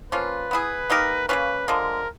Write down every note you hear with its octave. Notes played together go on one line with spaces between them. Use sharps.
F3 A#3 C#4 F4 B4
B3 E4 G#4
A#3 D#4 G4 A#4
C#3 F3 A#3 C#4 B4
D3 F3 G#3 A#4